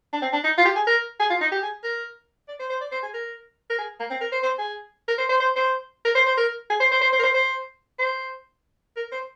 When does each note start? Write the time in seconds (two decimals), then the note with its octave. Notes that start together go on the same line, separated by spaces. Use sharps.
0.13 D4
0.22 C4
0.33 D4
0.44 D#4
0.58 F4
0.65 G4
0.76 G#4
0.87 A#4
1.20 G#4
1.30 F4
1.41 D#4
1.52 G4
1.62 G#4
1.84 A#4
2.48 D5
2.59 C5
2.70 C5
2.81 D5
2.92 C5
3.03 G#4
3.14 A#4
3.70 A#4
3.78 G#4
4.00 A#3
4.10 C4
4.21 A#4
4.32 C5
4.43 C5
4.58 G#4
5.08 A#4
5.18 C5
5.29 C5
5.40 C5
5.56 C5
6.05 A#4
6.15 C5
6.26 C5
6.37 A#4
6.70 G#4
6.80 C5
6.91 C5
7.02 C5
7.12 C5
7.19 A#4
7.23 C5
7.34 C5
7.99 C5
8.96 A#4
9.12 C5